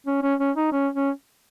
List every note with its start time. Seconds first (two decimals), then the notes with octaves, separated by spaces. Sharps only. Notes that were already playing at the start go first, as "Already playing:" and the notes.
0.07 C#4
0.23 C#4
0.40 C#4
0.56 D#4
0.72 C#4
0.95 C#4